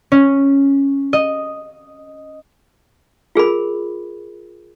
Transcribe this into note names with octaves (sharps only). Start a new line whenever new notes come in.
C#4
D#5
F4 G#4 A#4 B5